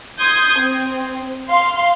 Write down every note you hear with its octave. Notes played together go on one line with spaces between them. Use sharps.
C6 D#6 G6 G#6
C4
F5 C6